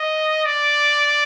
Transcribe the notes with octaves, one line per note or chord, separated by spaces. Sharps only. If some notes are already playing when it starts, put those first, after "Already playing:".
Already playing: D#5
D5